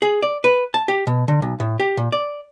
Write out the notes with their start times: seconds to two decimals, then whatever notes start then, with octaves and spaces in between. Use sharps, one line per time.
0.02 G#4
0.22 D5
0.44 B4
0.74 A5
0.88 G4
1.07 B2
1.28 D3
1.42 B1
1.60 A2
1.80 G4
1.97 A#2
2.12 D5